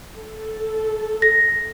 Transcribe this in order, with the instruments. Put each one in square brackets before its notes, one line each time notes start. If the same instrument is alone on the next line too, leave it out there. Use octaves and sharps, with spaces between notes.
[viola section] A4
[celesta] A#6